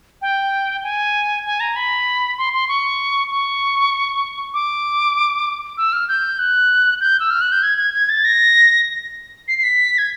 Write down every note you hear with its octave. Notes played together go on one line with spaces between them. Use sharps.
G5
G#5
G#5
A#5
B5
C6
C6
C#6
C#6
D6
E6
F6
G6
F#6
G6
E6
F6
F#6
G6
G#6
G#6
G#6
A6
A#6
C7
C7
B6
G#6